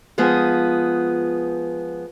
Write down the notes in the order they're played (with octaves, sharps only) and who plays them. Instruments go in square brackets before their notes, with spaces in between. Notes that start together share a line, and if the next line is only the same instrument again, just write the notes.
[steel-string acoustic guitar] F3 G#3 B3 G#4